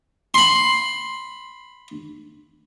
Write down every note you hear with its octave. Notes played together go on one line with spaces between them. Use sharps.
B5 C6